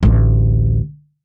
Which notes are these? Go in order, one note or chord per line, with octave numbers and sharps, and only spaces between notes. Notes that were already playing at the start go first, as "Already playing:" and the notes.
A1 D2